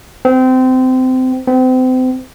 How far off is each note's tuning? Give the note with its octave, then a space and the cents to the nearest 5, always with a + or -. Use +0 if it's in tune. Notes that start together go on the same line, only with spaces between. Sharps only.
C4 -25
C4 -35